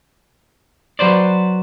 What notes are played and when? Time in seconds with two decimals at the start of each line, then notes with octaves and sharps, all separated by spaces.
0.99 F#3 B4 C5 D5